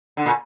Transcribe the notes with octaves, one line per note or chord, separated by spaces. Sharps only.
D3
A#2